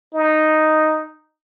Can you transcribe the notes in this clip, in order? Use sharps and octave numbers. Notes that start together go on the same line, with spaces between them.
D#4